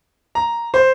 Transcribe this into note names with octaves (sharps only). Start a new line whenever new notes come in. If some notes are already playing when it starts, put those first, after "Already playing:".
A#5
C5